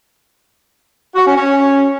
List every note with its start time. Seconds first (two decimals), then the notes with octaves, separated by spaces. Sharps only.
1.15 F#4
1.26 C#4
1.36 C#4